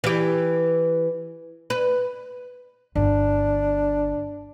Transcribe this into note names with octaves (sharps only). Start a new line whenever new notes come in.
E3 G4
B4
G1 D4